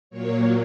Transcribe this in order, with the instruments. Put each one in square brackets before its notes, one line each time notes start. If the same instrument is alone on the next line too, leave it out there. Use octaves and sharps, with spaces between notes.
[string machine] A#2 F#3 A#3 C#5